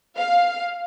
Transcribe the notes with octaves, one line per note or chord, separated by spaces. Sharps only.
F5